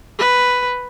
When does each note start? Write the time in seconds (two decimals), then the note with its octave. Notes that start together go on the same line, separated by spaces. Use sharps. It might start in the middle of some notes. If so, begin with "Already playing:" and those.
0.19 B4